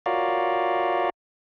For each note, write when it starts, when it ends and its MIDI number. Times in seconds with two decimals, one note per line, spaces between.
0.06 1.10 65
0.06 1.10 66
0.06 1.10 70
0.06 1.10 73
0.06 1.10 74
0.06 1.10 77